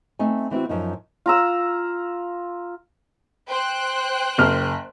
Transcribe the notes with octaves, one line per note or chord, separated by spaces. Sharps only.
A3 C4 D#4 G#5
E3 C4 E4 F#4
F#2 F3 D#4
F4 A#5 E6
C5 G5 F#6
F#1 F6